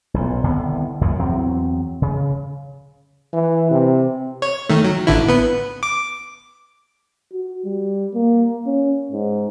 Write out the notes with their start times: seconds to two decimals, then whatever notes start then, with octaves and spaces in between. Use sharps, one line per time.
0.14 B1 A#2
0.44 C2 D3 D#3 B3
1.01 C#2 F#2 A#2 D#3
1.19 E2 F#3 C4
2.02 C#3
3.33 E3
3.71 C3
4.42 C#5
4.69 D#3 A3
4.85 F#3
5.07 A1 D3 E4
5.28 B3 B4
5.83 D6
7.33 F#4
7.65 G3
8.14 A#3
8.66 C#4
9.12 G#2